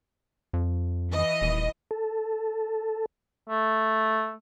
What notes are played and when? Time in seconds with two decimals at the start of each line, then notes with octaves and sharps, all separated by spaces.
0.53 F2
1.12 E3 D#5
1.42 D#1
1.91 A4
3.50 A3